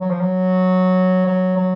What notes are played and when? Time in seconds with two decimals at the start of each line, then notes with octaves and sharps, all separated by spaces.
0.01 F#3
0.10 F3
0.20 F#3
1.26 F#3
1.57 F#3